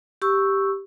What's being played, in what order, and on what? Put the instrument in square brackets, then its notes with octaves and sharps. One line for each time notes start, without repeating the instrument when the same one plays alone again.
[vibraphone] G4 C#6 E6